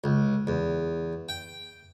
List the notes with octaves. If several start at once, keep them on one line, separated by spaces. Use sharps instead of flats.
C#2
E2
G5